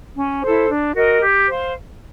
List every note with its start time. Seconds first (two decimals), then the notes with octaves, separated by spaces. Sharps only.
0.17 C#4
0.42 E4 A4 C5
0.69 D4
0.94 F#4 A#4 D#5
1.20 G4
1.47 C5 F5